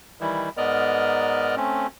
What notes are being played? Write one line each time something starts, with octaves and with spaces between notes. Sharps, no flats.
D#3 E3 G3 E4
G#2 B3 A#4 D5 D#5 F6
A3 C4 C#4